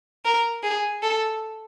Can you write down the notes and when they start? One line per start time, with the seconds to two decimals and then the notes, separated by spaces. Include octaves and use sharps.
0.25 A#4
0.63 G#4
1.02 A4